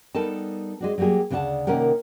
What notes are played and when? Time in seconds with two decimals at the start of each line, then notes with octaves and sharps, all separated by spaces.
0.15 G3 B3 D#4 A4 A#4 A5
0.81 G#3 D4 F#4
0.98 F#3 G3 A#3 G4 G#4
1.30 D2 C#3 D4 D5 F#5 A5
1.67 C3 D#3 A#3 C#4 A#4 F#5